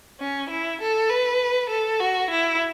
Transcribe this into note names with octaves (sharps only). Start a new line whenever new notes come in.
C#4
E4
A4
B4
A4
F#4
E4